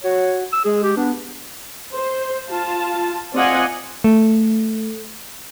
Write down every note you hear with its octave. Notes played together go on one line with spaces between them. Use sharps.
F#4 C#5
E6
G#3 G#4
G4
B3 D4
C5
F4 A5
C4 F4 D5 D#5 F#5 G#5
A3